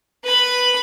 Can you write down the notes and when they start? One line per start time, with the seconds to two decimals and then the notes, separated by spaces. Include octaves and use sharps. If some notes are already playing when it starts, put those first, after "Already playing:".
0.24 B4 B5